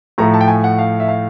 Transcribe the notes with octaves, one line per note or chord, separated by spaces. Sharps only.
A2 F3 A3 A#5
A5
G5
G#5
F#5
F5
E5
F5